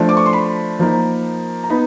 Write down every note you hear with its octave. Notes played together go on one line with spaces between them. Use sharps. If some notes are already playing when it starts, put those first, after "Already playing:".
Already playing: F3 A3 D4
D6
C#6
C6
B5
F3 A#3 D#4
A#5
B3 D#4 B5